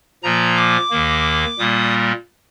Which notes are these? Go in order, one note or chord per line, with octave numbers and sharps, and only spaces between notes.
A#2 F3 A#3 A#5
D6
D#2 D#3 A#3
A#2 G3 A#3 D#6